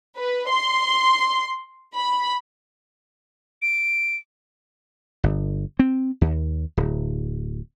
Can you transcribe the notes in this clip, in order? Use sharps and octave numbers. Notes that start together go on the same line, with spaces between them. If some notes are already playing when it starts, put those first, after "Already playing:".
B4
C6
B5
D7
G1
C4
D#2
D1